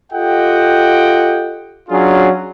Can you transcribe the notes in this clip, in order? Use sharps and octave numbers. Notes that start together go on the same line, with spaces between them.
F4 G4 A4 D#5 F#5 G5
F#3 C#4 D4 F4 F#4 G#4